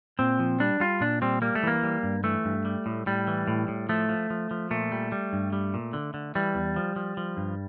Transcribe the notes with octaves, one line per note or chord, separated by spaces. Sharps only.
A#2 C4
F3
G3 D4
G3 F4
A#2 D4
G3 C4
G3 A#3
A3
E3 A#3
G3
G2
E3 A3
G2
G3
A2
A2 G3
E3
A2
A2
F3 A3
F3
F3
F3
A#2 A3
G3
G3
G2
G3
A#2
D3
D3
E3 G3
E2
F3
F3
F3
G2